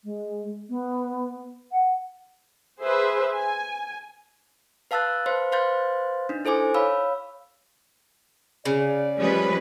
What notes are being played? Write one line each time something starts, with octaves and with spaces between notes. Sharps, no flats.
G#3
B3
F#5
G#4 B4 C5 E5
G#5
B4 F5 A5 E6 F#6 A6
B4 C5 F5 C6
B4 C5 F5 C6 G6 A6
D4 D#4
E4 A4 C5 G#5 D6
C#5 F5 B5 E6
C#3 D5
F3 G3 G#3 C#4 G4 B4